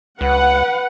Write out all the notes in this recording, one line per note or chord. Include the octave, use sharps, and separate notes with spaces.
C#2 B4 F#5